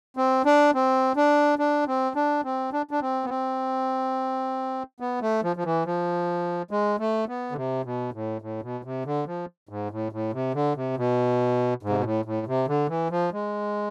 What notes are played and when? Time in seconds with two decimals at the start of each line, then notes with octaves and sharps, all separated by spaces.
0.17 C4
0.45 D4
0.74 C4
1.16 D4
1.59 D4
1.87 C4
2.16 D4
2.44 C4
2.73 D4
2.91 D4
3.02 C4
3.24 B3
3.29 C4
5.00 B3
5.22 A3
5.43 F3
5.56 F3
5.64 E3
5.86 F3
6.71 G#3
6.99 A3
7.28 B3
7.52 D3
7.56 C3
7.85 B2
8.13 A2
8.42 A2
8.62 B2
8.84 C3
9.05 D3
9.26 F3
9.69 G#2
9.91 A2
10.12 A2
10.33 C3
10.54 D3
10.76 C3
10.97 B2
11.83 G#2
11.89 C3
11.97 B2
12.04 A2
12.25 A2
12.47 C3
12.68 D3
12.89 E3
13.11 F3
13.32 G#3